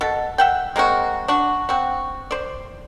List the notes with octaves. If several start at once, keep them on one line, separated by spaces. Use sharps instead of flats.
B2 A4
E5 F#5 G5
G#3 A#3 C4 F#4
D4 F#4
C4 F#4
C5 D5